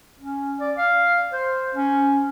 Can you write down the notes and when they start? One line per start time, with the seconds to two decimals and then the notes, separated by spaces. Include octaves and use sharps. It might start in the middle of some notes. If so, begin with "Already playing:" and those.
0.20 C#4
0.60 D5
0.77 F5
1.33 C5
1.75 C#4